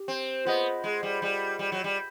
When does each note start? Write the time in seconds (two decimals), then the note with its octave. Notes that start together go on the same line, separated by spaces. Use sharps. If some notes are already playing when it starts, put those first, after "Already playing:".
Already playing: G4
0.08 C4
0.45 B3 F4 G#4 C5 D#5 F#5
0.84 G#3
1.03 G3
1.22 G3
1.59 G3
1.72 F#3
1.84 G3